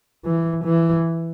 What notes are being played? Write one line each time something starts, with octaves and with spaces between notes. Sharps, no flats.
E3
E3